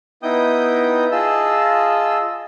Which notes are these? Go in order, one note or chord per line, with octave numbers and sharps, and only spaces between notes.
B3 D#4 E4 G5 D#6 G6
F4 G#4 D#5 A5 E6